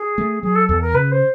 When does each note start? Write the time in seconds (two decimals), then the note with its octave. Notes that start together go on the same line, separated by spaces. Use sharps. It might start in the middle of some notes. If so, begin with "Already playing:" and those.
Already playing: G#4
0.18 A3
0.43 F#3 G#4
0.55 A4
0.68 E2 A4
0.81 A#4
0.94 C#3 B4
1.11 C5